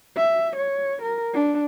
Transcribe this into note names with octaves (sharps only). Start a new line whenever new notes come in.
E5
C#5
A#4
D4